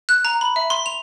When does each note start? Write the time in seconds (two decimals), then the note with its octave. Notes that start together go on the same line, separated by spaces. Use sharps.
0.09 F#6
0.25 A#5
0.41 B5
0.56 E5
0.70 C6
0.86 F7